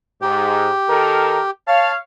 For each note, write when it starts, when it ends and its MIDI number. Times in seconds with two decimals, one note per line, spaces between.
0.21 0.69 44
0.21 1.51 67
0.88 1.39 51
0.88 1.39 69
0.88 1.39 70
1.67 1.95 73
1.67 1.95 77
1.67 1.92 81